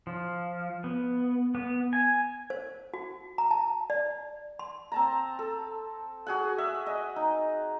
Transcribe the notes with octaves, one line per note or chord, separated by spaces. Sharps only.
F3
B3
B3
G#5
C5
F#4
A#5
A5
D5
C6
C4 A5 A#5
A4
F#4 G#4 F#5
E5
D#5
D#4